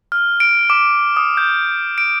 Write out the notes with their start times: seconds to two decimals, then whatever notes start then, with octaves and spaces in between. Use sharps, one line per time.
0.12 F6
0.40 D7
0.70 D6
1.17 D#6
1.37 G6
1.98 D7